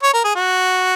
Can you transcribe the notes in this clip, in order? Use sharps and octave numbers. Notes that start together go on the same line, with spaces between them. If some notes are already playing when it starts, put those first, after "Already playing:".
C#5
A#4
G#4
F#4